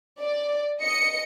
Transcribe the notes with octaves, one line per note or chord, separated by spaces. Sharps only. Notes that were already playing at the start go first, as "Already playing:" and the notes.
D5
D#5 C#7